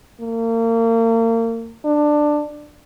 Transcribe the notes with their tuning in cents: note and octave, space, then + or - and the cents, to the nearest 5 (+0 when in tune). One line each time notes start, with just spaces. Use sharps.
A#3 -35
D4 +15